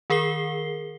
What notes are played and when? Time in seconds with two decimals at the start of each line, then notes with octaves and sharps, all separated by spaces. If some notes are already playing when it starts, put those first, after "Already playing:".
0.10 D#3 G#4 A#4 C7 G7